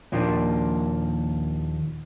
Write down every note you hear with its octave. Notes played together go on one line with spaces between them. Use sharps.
D#2 A#2 F3 A#3 D4